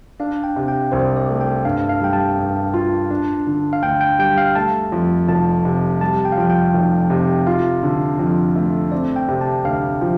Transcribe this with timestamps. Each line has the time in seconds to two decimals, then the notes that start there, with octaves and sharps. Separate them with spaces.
0.20 D4 F5
0.44 G5
0.56 C3
0.68 G5
0.92 C2 C5
1.17 D5
1.29 A3
1.41 G5
1.65 G2 F5
1.89 F5
2.01 G3 G5
2.13 A5
2.38 G2
2.74 F4
3.10 D4
3.47 D3
3.73 F5
3.82 D2 G5
4.01 G5
4.19 G3 G5
4.38 F5
4.55 A3 A5
4.92 F2
5.28 F1 A5
5.65 C3
6.01 G3 A5
6.25 G5
6.32 F5
6.37 F2 G5
6.50 G5
6.74 F1
7.10 C3
7.47 F4 F5
7.83 D3
8.19 F2
8.56 A3
8.92 C4 D5
9.16 G5
9.28 C3
9.41 A5
9.65 D2 F5
10.01 F3